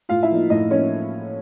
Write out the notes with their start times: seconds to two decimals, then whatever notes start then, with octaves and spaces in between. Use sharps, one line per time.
0.09 A2 F4 F5
0.23 E4 E5
0.30 F3 A#3 D#4
0.50 A2 D#4 D#5
0.70 F3 A#3 C#4 D#4 C#5